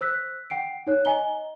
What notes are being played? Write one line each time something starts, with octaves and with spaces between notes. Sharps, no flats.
C5 E6 F#6 B6
F#5 G5 C7 D7
D#4 C#5 F#6
D#5 G#5 A#5 G7